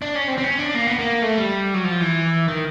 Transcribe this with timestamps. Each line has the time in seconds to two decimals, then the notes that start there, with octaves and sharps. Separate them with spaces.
0.02 D4
0.15 C#4
0.28 C4
0.38 C4
0.44 C#4
0.59 D4
0.75 A#3
0.87 B3
0.99 A#3
1.22 A3
1.38 G3
1.74 F#3
1.84 F3
2.00 E3
2.48 D#3